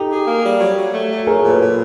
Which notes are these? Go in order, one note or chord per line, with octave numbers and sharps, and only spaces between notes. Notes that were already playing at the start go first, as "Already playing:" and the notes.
Already playing: D#4 G4 A4
G#4
A#3
G3
F#3
F#3
A3
F#3
F#3 G#4 A#4
A#2
A4 B4
A#2